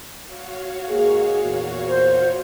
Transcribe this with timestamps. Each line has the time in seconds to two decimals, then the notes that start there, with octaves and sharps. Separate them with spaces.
0.24 F#4 C#5 F5
0.88 G#2 A#3 G#4
1.42 E2 A#2
1.88 C5